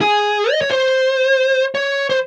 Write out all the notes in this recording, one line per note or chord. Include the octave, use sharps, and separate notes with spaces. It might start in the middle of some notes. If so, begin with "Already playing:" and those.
G#4
D#5
C#5
C5
C#5
C5